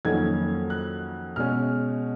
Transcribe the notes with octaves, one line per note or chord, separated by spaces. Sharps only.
F2 D#3 F#3 A#3 C#4 G#6
F#6
B2 G#3 C#4 F6